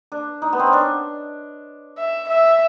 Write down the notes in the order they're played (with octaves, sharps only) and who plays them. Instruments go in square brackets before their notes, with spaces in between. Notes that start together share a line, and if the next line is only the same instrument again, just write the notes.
[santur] D4
D#4
B3
C4
C#4
D4
[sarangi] E5
E5